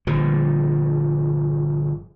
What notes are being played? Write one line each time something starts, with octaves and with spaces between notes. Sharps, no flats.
G1 A#2 F3